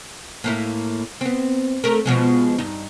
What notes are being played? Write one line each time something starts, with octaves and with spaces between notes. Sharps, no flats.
A2 A#3 E4
B3 C4
A3 A#4
B2 F3 G#3
G2 D#4